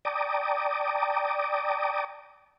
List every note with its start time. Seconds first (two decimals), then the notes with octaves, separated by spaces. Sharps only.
0.05 D5 G5 A5 A#5 D6 D#6